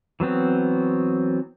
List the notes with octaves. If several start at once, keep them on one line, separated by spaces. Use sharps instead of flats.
E3 F#3 B3 C4